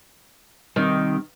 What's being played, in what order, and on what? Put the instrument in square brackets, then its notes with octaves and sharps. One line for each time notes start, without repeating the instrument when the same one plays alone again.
[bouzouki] D#3 [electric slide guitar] G3 C4 G4